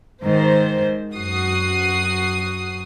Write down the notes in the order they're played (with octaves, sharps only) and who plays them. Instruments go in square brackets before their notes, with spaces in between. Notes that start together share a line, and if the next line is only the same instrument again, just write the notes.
[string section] G#2 D#3 C5
F#2 F#4 D#6 C7